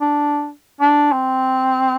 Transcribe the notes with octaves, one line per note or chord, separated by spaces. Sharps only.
D4
D4
C4